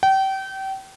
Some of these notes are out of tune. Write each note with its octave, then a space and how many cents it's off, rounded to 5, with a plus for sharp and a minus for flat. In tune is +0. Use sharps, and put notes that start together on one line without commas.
G5 -30